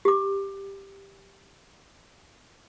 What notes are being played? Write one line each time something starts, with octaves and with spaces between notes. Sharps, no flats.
G4 D6